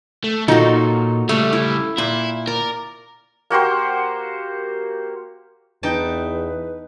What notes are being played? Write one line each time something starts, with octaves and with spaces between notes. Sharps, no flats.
A3
A#2 F#3 D#4 F4 F#4 A4
C#3 G3 A3
E4
A#2 E4 B5
A#4 D5
A#3 F#4 G4 C5
E2 D#4 B4 G5 A5